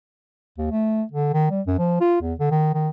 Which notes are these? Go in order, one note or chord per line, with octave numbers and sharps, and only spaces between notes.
D#2
A3
D3
D#3
G3
F#2
F3
F4
E2
D3
D#3
D#3